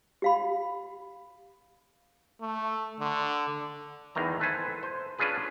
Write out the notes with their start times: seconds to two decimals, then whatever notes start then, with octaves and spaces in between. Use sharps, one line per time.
0.22 G4 F5 B5
2.41 A3
3.00 D3
4.15 E2 D#3 E3 A#5
4.40 A4 B4 C5 G#5
4.83 C5
5.19 C#4 D4 F4 G#4 B4